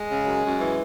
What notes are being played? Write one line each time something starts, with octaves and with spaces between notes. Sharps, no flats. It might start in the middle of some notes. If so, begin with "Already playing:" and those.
Already playing: G#3
C#3
F#2
F#2
E3